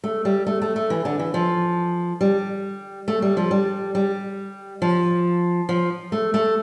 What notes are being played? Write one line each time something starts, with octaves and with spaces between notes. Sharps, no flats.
A3
G3
A3
A3
A3
E3
D3
E3
F3
G3
A3
G3
F3
G3
G3
F3
F3
A3
A3